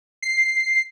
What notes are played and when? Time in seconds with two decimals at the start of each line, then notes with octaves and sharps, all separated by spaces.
0.22 C7